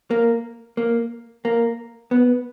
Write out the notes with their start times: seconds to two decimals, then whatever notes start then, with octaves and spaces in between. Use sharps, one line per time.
0.11 A#3
0.77 A#3
1.45 A#3
2.11 B3